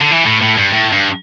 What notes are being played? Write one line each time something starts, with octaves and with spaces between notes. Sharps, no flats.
D3
E3
A2
A2
G2
A2
G2